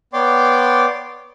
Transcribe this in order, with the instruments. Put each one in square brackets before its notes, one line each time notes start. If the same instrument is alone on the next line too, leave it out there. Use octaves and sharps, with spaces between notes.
[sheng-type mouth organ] B3 C#5 D5 G5 C6 D6